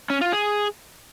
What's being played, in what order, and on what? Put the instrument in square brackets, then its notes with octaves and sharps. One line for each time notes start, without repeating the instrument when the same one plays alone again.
[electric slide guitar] C#4
F4
G#4